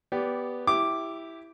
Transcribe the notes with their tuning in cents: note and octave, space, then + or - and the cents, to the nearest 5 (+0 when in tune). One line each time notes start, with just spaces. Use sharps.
B3 +0 G4 +0 D5 -15
E4 +0 G4 +0 D6 +0